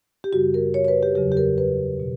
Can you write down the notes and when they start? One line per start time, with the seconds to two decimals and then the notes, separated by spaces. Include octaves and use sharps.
0.24 G4
0.33 F#2 C#3 G3 F#4
0.54 A#4
0.74 C#5
0.85 C#5
0.88 B4
1.03 G4
1.16 E2 C#3 F#3 G4
1.32 G4
1.37 A#4
1.58 B4
2.00 B2